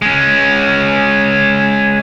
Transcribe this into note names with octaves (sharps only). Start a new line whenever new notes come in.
G#3 C#4